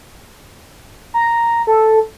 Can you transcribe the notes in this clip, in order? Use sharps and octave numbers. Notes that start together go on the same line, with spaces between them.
A#5
A4